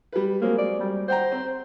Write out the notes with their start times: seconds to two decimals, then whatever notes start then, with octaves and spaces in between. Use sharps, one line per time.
0.13 G3 B4
0.41 F#3 G#3 A#3 C4
0.58 D5
0.80 G3
1.08 C5 F#5 G5 A#5
1.32 C4